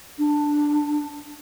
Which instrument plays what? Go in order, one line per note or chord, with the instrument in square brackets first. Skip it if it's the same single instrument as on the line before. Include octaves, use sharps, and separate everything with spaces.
[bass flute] D4